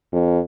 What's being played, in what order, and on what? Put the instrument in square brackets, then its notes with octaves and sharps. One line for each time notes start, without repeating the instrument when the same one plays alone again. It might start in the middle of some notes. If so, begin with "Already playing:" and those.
[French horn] F2